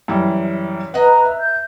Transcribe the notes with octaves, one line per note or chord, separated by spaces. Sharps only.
F#2 E3 G3
B4 D#5 F#5 A#5
E5
G6